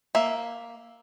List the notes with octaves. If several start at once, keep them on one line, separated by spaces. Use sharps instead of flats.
A#3 E5